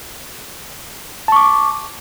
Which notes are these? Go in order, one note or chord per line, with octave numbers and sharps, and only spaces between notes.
A5 C#6 D6